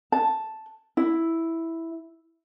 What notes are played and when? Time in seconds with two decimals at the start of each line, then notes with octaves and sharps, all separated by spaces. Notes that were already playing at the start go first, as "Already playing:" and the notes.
0.12 A5
0.97 E4